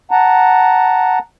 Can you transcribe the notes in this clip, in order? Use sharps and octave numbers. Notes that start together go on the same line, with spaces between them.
F#5 A5 A#5